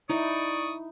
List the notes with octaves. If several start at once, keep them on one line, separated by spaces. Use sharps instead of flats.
D#4 E4 D5 C#6 D#6